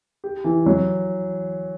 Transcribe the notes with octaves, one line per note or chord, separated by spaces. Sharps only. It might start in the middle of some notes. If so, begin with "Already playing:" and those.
G4
E3
F#3